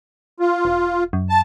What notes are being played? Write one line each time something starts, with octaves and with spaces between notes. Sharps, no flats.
F4
E1
F#2
A5